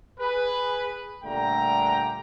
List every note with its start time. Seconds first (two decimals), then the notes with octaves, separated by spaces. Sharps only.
0.20 G#4 B4
1.24 A#2 D3 G3 A3 G5 A#5